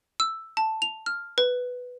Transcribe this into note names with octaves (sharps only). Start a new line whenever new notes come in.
E6
A5
F7
F6
B4